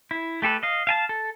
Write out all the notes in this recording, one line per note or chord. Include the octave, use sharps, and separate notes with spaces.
E4
A3 G4 A4 B4
D#5 F5
F5 G#5 A5
A4